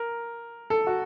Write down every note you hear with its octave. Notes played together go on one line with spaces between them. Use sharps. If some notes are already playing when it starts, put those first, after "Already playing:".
Already playing: A#4
A4
F#4